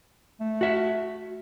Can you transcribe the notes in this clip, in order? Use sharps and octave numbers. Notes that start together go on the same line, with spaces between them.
A3
F#4 E5